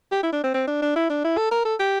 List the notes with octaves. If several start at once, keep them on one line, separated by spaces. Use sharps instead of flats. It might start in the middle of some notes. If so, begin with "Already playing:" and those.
G4
E4
D4
C4
C4
D4
D4
E4
D4
E4
A4
A#4
A4
G4